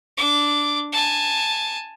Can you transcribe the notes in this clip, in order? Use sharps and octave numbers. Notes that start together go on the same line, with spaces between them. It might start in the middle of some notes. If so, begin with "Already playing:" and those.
D4 D6
G#5 A5